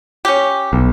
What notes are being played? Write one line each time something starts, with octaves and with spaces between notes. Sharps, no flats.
C#4 G4
B1